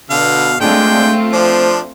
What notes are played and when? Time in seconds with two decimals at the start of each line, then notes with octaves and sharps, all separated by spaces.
0.10 B2 D3 F5
0.61 G#3 A3 C4 D4 F4 G5
1.33 F3 D4 C5